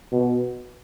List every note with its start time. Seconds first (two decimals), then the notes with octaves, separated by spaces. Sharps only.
0.12 B2